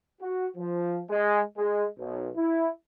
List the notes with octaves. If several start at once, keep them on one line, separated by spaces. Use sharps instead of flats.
F#4
F3
G#3
G#3
B1
E4